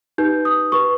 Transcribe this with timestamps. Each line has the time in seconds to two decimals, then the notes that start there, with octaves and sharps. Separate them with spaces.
0.18 D#4 G4 B4 G6
0.45 D#6
0.72 G4 B4 C#6